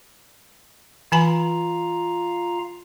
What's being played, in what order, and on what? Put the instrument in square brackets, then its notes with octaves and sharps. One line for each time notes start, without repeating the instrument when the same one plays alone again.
[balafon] E3 G#5 B5 [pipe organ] F4 F5 A#5